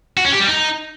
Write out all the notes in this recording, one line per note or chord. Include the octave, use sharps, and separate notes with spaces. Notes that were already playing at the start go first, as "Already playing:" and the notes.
F#4
C#4
G4
G3
D#4